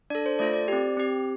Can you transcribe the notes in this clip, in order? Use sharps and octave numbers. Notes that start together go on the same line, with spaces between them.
D4 A4 D5
C5
A3 F4 A4 D5
D5
C4 G4
C4 G4